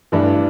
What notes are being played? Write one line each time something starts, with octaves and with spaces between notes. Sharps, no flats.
G2 E3 A3 D4